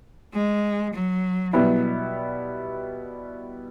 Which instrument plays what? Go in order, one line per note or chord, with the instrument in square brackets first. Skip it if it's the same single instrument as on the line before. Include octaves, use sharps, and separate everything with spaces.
[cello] G#3
F#3
[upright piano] B2 G3 B3 E4 [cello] F#3